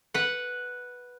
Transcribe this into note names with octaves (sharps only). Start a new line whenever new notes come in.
B4 F#5